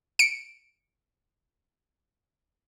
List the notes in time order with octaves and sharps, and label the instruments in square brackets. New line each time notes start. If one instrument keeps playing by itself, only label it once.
[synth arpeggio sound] C#7 D7